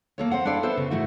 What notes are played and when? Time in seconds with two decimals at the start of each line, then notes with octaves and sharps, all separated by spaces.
0.18 A#3 A4 C#5
0.31 C4 C5 F#5
0.45 D4 E4 A4 D5 F5 G5
0.63 B3 A4 C5 E5
0.77 D2 C#3
0.90 G#2 F#3 A3 E4 F#4